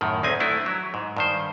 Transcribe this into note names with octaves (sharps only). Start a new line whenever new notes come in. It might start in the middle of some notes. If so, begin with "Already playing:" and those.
F#2 A2 D#3
D2 G#3 C4 G#5
A3 D4 E4
F#3
G#2
G2 D#3 C5